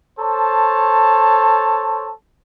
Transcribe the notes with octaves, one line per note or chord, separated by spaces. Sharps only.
A4 C5 C#5 A5